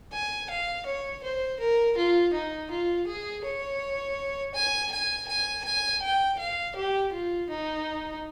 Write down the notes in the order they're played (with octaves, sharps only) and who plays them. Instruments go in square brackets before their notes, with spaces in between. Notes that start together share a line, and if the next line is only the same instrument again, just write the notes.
[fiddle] G#5
F5
C#5
C5
A#4
F4
D#4
F4
G#4
C#5
G#5
G#5
G#5
G#5
G5
F5
G4
F4
D#4